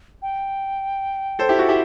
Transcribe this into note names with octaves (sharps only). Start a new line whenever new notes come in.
G5
A4 C5
E4 G4
F#4
E4 G4